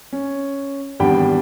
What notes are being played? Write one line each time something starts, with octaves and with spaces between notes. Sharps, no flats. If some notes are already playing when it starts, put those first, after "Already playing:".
C#4
G#1 E2 G3 D4 G5 B5